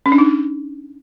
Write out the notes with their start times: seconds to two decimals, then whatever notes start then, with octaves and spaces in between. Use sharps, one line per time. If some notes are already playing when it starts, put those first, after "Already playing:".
0.06 C#4
0.12 D4
0.18 D#4